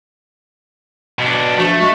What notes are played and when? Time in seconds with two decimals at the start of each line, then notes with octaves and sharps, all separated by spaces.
1.19 B2 D4
1.59 F3 A3 D4 F#4
1.80 G#3 F#4